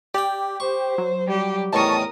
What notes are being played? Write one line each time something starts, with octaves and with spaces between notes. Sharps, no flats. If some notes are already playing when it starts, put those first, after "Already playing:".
G4 D5 G5
C5 C#6
F#3
G3 G4
E2 A2 D#3 A#4 A5 C#6 D#6